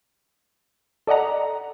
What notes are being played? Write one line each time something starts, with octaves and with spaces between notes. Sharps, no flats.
A4 D5 D#5 F#5 A#5